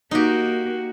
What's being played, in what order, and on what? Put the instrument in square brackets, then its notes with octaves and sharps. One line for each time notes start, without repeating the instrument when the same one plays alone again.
[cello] A#3 F#4 [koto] D#4 G4